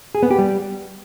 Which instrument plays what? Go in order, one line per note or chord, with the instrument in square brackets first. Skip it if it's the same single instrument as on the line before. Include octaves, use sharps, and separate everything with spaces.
[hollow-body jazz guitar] G#4
B3
G4
G3